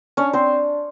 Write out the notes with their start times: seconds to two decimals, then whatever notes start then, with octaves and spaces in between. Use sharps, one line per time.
0.17 C#4 D4 C#5
0.33 C4 C5